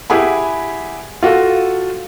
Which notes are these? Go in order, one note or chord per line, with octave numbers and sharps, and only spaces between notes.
E4 G4 G#4 F#5 G#5 B5
F4 F#4 A4